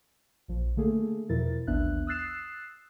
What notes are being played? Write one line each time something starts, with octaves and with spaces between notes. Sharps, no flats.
A#1 F3
D3 A3 A#3 G#4 A4
E2 B2 F3 E4 A#4 A6
A1 D#2 B3 D4 E5 F#6
D#6 E6 F#6 A6 C7 E7